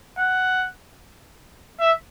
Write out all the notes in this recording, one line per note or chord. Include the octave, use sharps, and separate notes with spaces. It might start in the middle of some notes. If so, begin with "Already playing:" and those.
F#5
E5